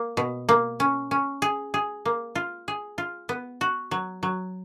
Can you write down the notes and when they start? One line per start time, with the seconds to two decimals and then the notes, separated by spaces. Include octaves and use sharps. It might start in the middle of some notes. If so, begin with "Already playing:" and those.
Already playing: A#3
0.17 B2
0.49 A#3
0.80 C#4
1.11 C#4
1.42 G#4
1.74 G#4
2.05 A#3
2.35 F4
2.68 G#4
2.98 F4
3.29 B3
3.61 F#4
3.91 F#3
4.23 F#3